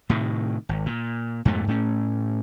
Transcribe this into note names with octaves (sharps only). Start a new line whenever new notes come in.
A2 C3 D#3
G#1
A#2
F2 G#2 B2 A3
A2 A3 C4 C#4